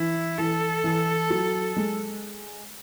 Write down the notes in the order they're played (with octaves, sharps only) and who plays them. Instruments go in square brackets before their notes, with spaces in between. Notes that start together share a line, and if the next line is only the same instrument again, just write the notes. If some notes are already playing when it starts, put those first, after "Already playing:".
Already playing: [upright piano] E3 [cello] E4
[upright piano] E3 [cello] A4
[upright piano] E3
F#3
G#3